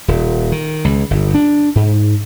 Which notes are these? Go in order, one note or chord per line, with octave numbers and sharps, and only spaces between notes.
D#1
D#3
C#2
G1
D4
G#2